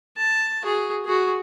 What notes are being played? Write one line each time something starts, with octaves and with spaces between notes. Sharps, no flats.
A5
F#4 G#4
F#4 G#4